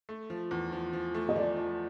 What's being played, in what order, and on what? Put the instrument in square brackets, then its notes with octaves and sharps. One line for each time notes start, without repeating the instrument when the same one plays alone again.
[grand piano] A3
F3
E2
F3
F3
A3
[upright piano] D#5
[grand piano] F3 [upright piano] D5
[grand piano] F3